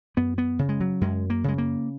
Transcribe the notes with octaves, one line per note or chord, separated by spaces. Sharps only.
F#2 B3
B3
C#3
G#3
F#3
F#2 G#3
A#3
C#3 G#3
A#3